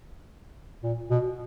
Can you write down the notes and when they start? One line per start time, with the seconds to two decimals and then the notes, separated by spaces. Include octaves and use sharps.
0.84 A#2
1.10 B2